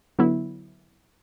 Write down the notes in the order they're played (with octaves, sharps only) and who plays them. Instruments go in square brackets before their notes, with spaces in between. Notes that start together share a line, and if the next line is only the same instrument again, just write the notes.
[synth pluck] D3 F#3 B3 E4